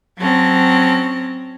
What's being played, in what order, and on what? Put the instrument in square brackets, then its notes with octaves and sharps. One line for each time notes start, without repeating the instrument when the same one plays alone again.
[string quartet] F#3 C4 C#4 A5 A#6